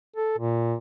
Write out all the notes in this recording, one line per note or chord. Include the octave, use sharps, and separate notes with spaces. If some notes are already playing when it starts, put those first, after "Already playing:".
A4
A#2